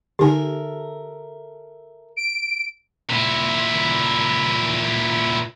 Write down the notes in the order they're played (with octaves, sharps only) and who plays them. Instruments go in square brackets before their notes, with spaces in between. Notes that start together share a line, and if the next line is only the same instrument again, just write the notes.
[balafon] D3 D#4 G#5 [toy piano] G4 [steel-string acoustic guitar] A4 A#4 E5
[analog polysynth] D7
[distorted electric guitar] A#2 E4